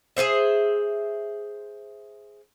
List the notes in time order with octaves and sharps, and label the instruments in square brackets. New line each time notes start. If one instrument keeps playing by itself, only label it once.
[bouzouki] G#4 A4 C5 E5